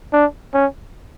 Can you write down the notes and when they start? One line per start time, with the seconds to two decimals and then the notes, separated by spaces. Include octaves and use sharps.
0.13 D4
0.54 C#4